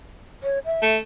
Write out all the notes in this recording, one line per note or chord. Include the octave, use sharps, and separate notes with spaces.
C#5
E5
A3